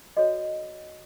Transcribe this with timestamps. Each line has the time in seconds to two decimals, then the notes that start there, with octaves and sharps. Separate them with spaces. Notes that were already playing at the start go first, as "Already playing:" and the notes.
0.17 F#4 A4 C#5 D#5